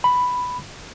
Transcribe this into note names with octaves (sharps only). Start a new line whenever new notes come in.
B5